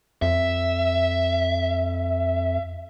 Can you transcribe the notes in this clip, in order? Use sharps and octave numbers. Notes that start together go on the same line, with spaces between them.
F2 E5